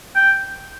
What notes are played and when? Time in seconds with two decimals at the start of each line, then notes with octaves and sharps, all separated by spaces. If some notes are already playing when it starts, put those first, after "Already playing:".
0.15 G5